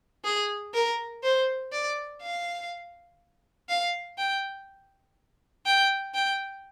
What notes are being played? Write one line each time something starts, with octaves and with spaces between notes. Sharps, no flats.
G#4
A#4
C5
D5
F5
F5
G5
G5
G5